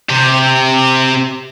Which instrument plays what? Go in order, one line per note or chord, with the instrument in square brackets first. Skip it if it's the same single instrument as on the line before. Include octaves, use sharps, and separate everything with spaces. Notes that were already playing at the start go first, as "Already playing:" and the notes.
[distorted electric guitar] C3 G4